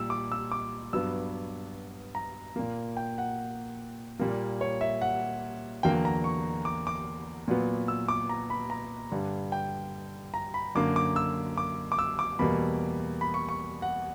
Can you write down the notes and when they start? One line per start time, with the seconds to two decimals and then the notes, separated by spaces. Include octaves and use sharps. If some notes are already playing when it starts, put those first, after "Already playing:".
Already playing: A#2 G3 E6
0.10 D6
0.32 E6
0.52 D6
0.93 G2 F#3 B3 E6
2.15 A#5
2.56 A#2 A#3
2.97 G5
3.18 F#5
4.19 A#2 G3 A#3
4.61 C#5
4.81 E5
5.01 F#5
5.83 E2 D3 F#3 A#3 G5
6.05 A#5
6.24 C#6
6.65 D6
6.87 D6
7.48 A#2 F#3 B3
7.88 E6
8.08 D6
8.29 A#5
8.50 B5
8.70 A#5
9.12 G2 D3 G3
9.52 G5
10.34 A#5
10.54 B5
10.75 F#2 D3 A#3 D6
10.96 D6
11.16 E6
11.58 D6
11.92 D6
11.99 E6
12.19 D6
12.39 E2 B2 G3 A#3 B5
13.21 B5
13.34 C#6
13.49 C#6
13.82 F#5